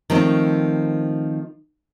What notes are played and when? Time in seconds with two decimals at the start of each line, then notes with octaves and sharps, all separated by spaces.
0.10 D#3 F3 A3 C4